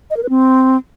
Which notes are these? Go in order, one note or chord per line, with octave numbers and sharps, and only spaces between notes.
D#5
A#4
B4
C4